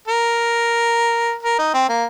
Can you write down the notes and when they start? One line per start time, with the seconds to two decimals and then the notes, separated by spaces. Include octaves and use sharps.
0.08 A#4
1.43 A#4
1.59 D#4
1.74 C4
1.89 A#3